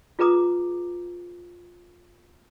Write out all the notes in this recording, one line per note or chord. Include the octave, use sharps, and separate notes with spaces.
F4 G#4 B4 A#5 D6 D#6